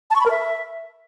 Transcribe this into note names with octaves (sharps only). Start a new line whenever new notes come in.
A5
C#6
B5
A#4
E5